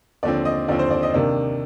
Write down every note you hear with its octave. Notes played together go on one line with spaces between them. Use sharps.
D#2 D3 F3 C4 D5
D#5
D#2 D3 F3 C4 D5
C5
D5
D#5
C3 D#3 A#3 D4